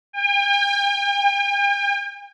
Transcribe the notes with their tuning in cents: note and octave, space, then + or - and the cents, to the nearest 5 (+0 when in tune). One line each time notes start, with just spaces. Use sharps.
G5 +45